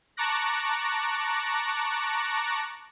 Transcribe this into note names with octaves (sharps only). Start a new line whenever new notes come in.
A5 A#5 C#6 D6 F#6 A#6